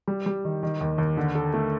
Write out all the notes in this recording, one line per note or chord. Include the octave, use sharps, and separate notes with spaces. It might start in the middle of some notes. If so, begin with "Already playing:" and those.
G3
G3
D#3
D#3
D#2
D#2
D3
A4
A3